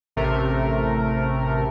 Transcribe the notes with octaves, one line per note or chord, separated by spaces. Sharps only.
A1 C3 A3 A#4